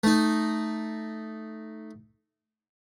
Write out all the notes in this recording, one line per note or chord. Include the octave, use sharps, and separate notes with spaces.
A3 D#4